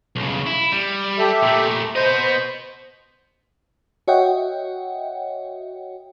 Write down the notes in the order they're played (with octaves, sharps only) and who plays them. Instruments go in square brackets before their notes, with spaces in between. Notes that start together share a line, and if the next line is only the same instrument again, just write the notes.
[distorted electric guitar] B1 C#3
E4
G3
[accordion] G4 A4 E5
[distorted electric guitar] A#2 A3
[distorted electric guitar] B3 D#5 [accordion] C5
[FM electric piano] F#4 C#5 D#5 E5 F#5 G5